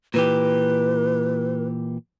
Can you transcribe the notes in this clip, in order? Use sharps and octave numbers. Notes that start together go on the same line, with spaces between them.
A#2 E3 G4 B4